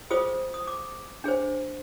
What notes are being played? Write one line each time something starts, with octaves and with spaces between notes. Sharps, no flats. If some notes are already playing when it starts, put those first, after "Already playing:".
F4 G#4 C5 D#6
D#6
D6
D4 G#4 C5